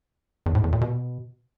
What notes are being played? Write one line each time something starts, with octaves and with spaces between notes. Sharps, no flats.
E2
A2
E2
A#2
B2